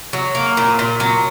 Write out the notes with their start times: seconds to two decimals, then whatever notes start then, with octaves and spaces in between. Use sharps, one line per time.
0.13 F#3
0.35 A#3
0.57 A#2
0.79 A#2
1.00 F#3